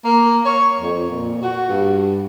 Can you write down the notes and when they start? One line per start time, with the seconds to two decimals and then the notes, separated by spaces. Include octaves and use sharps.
0.05 A#3
0.45 C#5
0.80 F2
1.10 A#2
1.42 F#4
1.68 G2